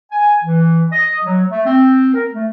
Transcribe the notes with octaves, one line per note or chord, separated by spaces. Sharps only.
G#5
E3
D#5
F#3
A3
C4
A#4
A3